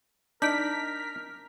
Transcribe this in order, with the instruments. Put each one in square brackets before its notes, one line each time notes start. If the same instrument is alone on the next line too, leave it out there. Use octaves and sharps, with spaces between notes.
[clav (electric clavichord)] D4 D#4 [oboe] A#4 [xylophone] G6 D7 [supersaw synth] B6